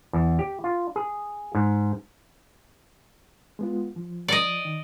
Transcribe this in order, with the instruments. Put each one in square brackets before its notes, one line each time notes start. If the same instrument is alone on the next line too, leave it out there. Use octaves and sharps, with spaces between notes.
[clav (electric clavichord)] E2
G4
F4
G#4
G#2
[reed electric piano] G#3 B3 F4
F3
[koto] D5 D#5
[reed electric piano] D#3